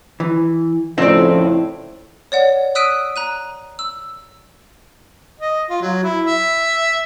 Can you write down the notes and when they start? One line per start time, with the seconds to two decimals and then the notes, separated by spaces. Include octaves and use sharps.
0.20 E3
0.98 F2 A2 C#3 F3 C4 D#4 D5
2.32 C#5 D5 F#5
2.75 D#6 E6 F#6 B6 D7 D#7
3.16 A#5 F#6 D#7
3.79 E6
5.40 D#5
5.70 F4
5.81 F#3
6.03 E4
6.25 E5